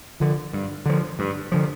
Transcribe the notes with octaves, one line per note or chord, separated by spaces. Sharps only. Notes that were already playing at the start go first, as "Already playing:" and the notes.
D3 F3
G2
D3 F3
G2
D3 F3